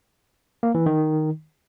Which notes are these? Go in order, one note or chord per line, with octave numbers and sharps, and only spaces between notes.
A#3
E3
D#3